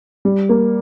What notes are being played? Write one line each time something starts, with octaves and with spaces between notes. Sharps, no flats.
G3
A#3